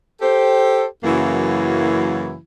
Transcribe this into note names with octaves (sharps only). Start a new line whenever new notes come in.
G4 A4 C5
F#2 C#3 E3 F#3 A#3 E4